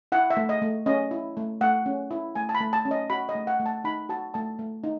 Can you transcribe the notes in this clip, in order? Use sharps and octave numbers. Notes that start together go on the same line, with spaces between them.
E4 F#5
E5
A3
D#5
A3
C#4 D#5
E4
A3
A3 F#5
C#4
E4
A3 G#5
A5
B5
A3
A5
C#4
D#5
F#4 B5
D#5
A3
F#5
A3
A5
D#4 B5
F#4 A5
A3 A5
A3
D#4